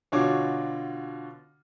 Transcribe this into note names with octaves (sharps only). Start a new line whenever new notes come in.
B2 D3 F4 F#4 C#5 D6